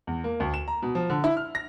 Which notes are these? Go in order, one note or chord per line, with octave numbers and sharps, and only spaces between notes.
E2
A#3
D2
E7
A#5
B2
F3
D3
E4
F6
A#6